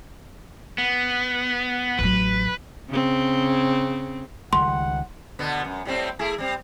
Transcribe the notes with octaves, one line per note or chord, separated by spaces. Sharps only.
B3
A1 F#3 B4
C#3 C4
C#2 D#3 G3 F#5 C6
B2 D3 B3
F#2
A2 G3 C4
A3 E4 G#4
G3 C4